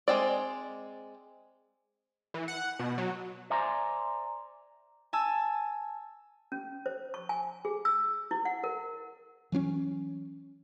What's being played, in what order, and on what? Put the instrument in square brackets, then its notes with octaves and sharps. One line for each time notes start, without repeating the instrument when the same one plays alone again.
[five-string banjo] G#3 C4 D5
[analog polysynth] E3
F#5
B2
F#3
[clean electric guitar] C5 D5 E5 G#5 A#5 C6
[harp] G#5 A5 E6
[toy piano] C#4
C5
C#6
G#5
G#4
E6
E4
F#5
A#4
[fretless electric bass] E3 F#3 C4 C#4